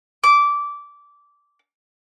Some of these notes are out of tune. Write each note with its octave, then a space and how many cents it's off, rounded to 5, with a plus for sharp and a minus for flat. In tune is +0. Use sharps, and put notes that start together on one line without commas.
D6 -15